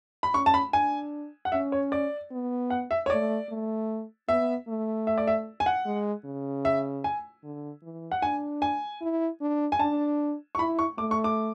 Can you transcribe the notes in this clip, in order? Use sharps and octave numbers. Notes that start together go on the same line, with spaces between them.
B5
C#4 C#6
A5
B5
D4 G#5
F#5
C#4 E5
C#5
D5
B3
F#5
E5
C#5
A3 D5
A3
B3 E5
A3
E5
D5
E5
G#5
F#5
G#3
C#3
E5
G#5
D3
E3
F#5
D4 G#5
G#5
E4
D4
G#5
D4 A5
C#6
E4 B5
C#6
A3 D6
C#6
D6